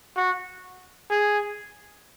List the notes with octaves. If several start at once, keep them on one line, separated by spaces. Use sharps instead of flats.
F#4
G#4